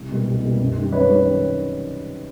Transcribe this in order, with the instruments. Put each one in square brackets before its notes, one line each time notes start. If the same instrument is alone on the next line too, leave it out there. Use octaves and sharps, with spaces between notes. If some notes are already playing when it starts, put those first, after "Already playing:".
Already playing: [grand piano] C2
B2 G3 A#3
C2
B2 G3 A#3
F#2
D#3 G3
F#2 B4 C#5
D#3 G3